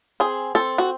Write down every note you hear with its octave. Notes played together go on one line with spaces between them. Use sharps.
C4 G#4
C4 A4
F#4